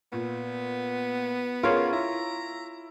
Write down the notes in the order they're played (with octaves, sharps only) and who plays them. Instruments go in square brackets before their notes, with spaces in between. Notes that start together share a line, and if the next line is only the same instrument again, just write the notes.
[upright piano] A#2 [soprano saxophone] B3
[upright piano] C#4 G#4 A#4 [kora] F4 C#5
[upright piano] E4 [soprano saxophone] A#5